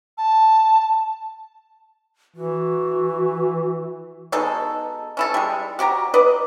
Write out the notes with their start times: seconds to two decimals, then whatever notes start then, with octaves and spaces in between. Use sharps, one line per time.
0.18 A5
2.36 E3 F#4
4.32 B2 G#3 D#4 A4
5.17 C#4 E4 A4
5.34 G3 G#3
5.79 F#4 G4 G#5 A#5
6.14 B4 D5 D#5